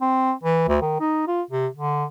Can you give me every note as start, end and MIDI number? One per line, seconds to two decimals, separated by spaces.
0.01 0.32 60
0.43 0.64 52
0.68 0.78 38
0.81 0.97 51
1.00 1.27 63
1.27 1.42 65
1.51 1.67 48
1.74 2.05 50